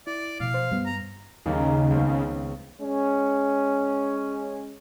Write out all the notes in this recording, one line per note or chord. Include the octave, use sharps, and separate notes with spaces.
E4 D5
B2 F3 F5
C5
G2 G3 B3
A#5
D#2 C#3 A#3
C#2 B3 C4
G#3 C#4